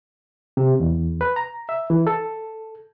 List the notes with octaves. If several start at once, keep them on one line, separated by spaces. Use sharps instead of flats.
C3
E2
B4
A#5
E5
E3
A4